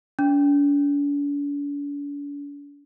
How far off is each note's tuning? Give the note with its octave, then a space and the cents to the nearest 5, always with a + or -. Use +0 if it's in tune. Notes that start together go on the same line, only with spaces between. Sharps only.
D4 -45